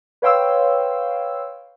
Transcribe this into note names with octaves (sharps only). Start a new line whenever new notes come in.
B4 C#5 F5 G5 C6 E6